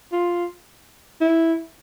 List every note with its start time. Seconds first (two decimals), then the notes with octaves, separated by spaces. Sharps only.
0.12 F4
1.21 E4